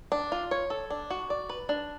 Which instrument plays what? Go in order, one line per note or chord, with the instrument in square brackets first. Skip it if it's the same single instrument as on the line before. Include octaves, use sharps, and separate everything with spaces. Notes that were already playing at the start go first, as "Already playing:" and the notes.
[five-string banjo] D4
F4
C#5
A4
D4
F#4
D5
B4
D4